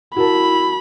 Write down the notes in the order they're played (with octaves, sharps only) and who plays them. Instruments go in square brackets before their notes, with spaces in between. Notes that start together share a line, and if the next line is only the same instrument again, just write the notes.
[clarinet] E4 [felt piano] F#4 A#4 A5 [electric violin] B5